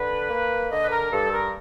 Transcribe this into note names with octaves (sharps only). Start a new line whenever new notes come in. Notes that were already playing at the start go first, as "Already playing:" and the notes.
Already playing: D3 B4
A#3
D3 D#5
B4
A#4
G2 A4
A#4